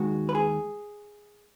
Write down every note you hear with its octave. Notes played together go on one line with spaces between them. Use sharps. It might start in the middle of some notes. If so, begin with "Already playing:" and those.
Already playing: D#2 D#3 G#3 F#4
B4
G#4